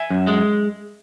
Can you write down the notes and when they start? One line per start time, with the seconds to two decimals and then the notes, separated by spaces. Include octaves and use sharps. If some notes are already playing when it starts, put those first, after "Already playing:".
Already playing: E5 G#5
0.10 F#2
0.27 G#3